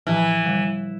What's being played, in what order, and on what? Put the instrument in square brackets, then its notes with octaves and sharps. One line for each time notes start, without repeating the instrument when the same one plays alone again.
[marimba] A2 F3 [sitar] E3
[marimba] D3 G3